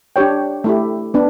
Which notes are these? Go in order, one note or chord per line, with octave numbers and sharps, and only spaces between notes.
D4 G4 C#5 G5
A3 E4 G4
B3 D4